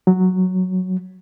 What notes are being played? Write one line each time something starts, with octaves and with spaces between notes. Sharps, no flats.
F#3